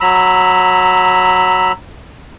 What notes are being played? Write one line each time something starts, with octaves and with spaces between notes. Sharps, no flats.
F#3 A#5 B5 E6